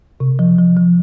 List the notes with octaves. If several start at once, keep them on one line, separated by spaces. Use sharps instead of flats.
C3
F3
F3
F3